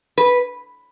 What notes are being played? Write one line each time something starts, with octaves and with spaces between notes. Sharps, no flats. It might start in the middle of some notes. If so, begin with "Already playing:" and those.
B4